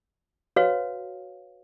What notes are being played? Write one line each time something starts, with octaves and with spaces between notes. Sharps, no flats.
F#4 B4 C#5 F5